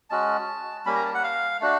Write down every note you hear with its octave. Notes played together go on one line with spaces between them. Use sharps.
G#3 C#4 F#4 A5
G3 A#3 C#4 B5
A#5
A5
F#5
F5
A3 D4 F#4